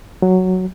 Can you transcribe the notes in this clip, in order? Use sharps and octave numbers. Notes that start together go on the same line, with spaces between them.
F#3